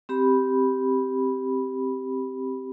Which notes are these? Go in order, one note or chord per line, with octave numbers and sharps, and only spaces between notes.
C4 G4 B5